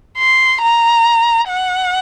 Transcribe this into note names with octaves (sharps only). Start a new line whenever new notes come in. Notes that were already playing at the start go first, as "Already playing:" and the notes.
C6
A#5
F#5